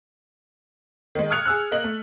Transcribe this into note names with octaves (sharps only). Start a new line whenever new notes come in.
D#3 G#3
D#6 F6 F#6 G#6 C#7 F7
G#4 E6 F#6
A#3 D#5 F#7
A3